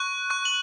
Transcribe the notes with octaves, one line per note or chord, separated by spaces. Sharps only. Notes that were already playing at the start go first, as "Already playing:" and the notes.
Already playing: C#6 F#6
C#6 F#6
F#7